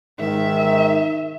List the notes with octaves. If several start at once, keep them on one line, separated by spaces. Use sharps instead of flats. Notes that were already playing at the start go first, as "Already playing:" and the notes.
G#2 D#3 E5